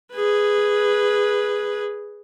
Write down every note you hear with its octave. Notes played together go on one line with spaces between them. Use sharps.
G#4 B4